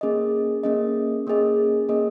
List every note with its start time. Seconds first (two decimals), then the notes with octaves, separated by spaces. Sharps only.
0.01 A#3 C#4 G#4 D#5
0.64 A#3 C#4 G#4 D#5
1.27 A#3 C#4 G#4 D#5
1.89 A#3 C#4 G#4 D#5